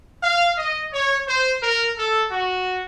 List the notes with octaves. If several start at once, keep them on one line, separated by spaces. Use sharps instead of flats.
F5
D#5
C#5
C5
A#4
A4
F#4